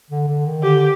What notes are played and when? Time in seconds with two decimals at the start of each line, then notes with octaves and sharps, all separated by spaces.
0.10 D3
0.28 D3
0.46 D#3
0.63 D3 G4